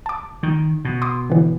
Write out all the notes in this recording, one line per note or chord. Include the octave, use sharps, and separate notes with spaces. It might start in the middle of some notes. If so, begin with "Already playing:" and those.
A5 D6
D#3
B2
C6 D6 D#6
D3 E3